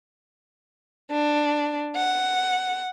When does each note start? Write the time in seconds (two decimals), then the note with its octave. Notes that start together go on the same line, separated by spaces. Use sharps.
1.11 D4
1.96 F#5